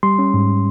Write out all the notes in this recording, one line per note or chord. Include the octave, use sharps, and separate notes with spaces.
G3 C6
C#4
G#2